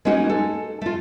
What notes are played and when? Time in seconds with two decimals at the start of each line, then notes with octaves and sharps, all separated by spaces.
0.05 G#3 A#3 B3 C#4 D#4 F#4
0.29 A4
0.81 A3 F4